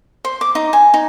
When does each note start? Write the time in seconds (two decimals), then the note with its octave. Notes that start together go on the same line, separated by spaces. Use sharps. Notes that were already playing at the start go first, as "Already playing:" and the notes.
0.25 C5
0.41 D6
0.55 D#4
0.73 G#5
0.94 D#4